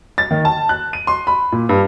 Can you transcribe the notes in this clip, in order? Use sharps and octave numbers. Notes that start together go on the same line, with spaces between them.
A6
D#3
A5
F#6
D#7
C6
B5
A#2
G2